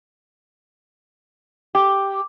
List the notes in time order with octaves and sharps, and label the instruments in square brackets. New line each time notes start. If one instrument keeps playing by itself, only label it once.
[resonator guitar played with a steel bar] G4